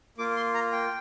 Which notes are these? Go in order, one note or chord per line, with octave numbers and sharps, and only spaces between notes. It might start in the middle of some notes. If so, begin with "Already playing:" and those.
A#3 F4 D6
C6
A#5
G5